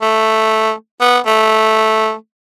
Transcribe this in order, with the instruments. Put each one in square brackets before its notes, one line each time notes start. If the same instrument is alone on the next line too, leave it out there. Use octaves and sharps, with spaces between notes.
[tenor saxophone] A3
B3
A3